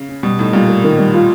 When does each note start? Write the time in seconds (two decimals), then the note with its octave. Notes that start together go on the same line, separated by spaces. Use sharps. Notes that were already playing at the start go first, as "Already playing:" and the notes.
Already playing: C#3
0.09 C#4
0.23 B2 G3
0.38 A2 D#4
0.53 A#2 G3
0.68 A#3
0.84 D#3
0.98 G3
1.14 F4